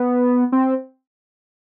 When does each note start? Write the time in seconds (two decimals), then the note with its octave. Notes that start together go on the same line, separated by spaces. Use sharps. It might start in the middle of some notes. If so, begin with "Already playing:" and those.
Already playing: B3
0.52 C4